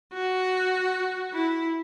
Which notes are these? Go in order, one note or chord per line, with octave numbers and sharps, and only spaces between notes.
F#4
E4